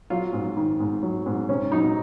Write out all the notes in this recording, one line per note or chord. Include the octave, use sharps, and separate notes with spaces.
F#3 F4
G#2
D#3
G#2
F#3
G#2
C3 C#4
F#3 D#4